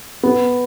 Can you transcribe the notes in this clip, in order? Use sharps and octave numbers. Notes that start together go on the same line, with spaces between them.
B3